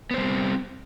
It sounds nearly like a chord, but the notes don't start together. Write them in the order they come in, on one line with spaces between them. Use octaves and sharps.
B3 C5 G3 C4